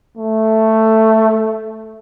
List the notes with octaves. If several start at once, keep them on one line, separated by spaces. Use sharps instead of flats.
A3